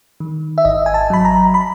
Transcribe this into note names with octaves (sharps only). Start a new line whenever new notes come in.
D#3
E5
G#1 D#5
G#5
A5
F#3 B5
A#5
B5